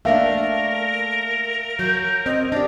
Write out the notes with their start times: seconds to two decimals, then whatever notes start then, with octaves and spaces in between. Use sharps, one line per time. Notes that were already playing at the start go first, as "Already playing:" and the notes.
0.05 A3 A#3 D4 A#4 E5 F5
1.79 F#3 G6
2.26 C4 D#5
2.52 D4 G4 D5